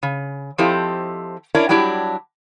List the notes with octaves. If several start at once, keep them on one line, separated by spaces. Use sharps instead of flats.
C#3
F3 C4 E4 G4 A4 D#5
C#4 D4 E4 A#4 C#5 D5
F#3 G3 D4 E4 G4